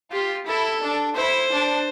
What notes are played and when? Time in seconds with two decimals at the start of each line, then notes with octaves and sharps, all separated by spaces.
0.12 F4 G4
0.47 E4 A4
0.81 D4
1.15 E4 C5
1.50 D4